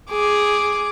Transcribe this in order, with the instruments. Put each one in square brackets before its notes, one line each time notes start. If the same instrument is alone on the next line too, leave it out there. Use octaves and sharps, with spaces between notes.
[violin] G#4 [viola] D6